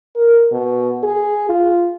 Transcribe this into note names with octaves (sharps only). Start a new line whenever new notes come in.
A#4
B2
G#4
F4